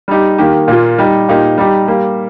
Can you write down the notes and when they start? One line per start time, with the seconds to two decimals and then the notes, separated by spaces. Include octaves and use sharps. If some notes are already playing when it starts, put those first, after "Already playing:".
0.08 G3 D#4 G4
0.38 D#3 A#3 G4
0.68 A#2 A#3 F4
0.98 G3 D#4 G4
1.29 A#2 A#3 D#4 G4
1.58 G3 D#4 G4
1.88 G3 A#3 G4